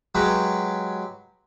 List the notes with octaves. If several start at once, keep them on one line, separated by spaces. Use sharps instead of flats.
F#3 G#3 G4 B4